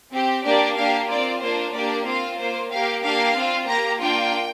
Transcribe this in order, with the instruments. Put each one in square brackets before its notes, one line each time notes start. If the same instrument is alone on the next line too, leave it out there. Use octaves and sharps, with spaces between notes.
[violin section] C4 G4
A#3 D4 G4 D5
A#3 D4 G4 F5
C4 F4 D5
A#3 D4 F4 C5
A#3 D4 G4 D5
C4 F4 F5
A#3 F4 C5
A#3 G4 F5
A#3 D4 G4 F5
C4 F4
A#3 G4 A#5
A#3 D4 F4 G5